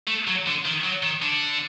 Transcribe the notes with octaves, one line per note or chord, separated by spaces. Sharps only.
A3
F#3
D3
D#3
F#3
D#3
D3